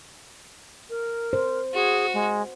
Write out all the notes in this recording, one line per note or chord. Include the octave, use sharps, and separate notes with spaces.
A#4
C5
F#4 G#4
G#3